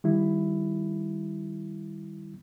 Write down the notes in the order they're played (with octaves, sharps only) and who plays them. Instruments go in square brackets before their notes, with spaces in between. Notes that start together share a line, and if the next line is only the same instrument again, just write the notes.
[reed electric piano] D#3 G3 E4